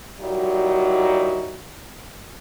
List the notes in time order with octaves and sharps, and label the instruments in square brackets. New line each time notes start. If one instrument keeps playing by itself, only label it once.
[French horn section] A#2 F#3 G3 D#4 E4 F#4